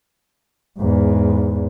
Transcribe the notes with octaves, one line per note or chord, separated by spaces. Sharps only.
E2 G#2